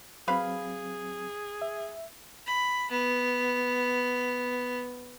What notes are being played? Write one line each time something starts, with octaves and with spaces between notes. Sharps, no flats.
F#3 C4 G#4 B4 F5 B5
E5
B5
B3